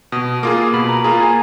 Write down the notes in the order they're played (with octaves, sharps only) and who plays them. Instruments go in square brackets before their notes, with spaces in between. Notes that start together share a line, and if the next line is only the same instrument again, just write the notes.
[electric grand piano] B2 [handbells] D#6
[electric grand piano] A#3 F4 G#4 [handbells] D6
[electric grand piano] B2 [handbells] B5
[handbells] A#5
[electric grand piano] A#3 F4 G#4 [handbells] A#5
[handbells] G#5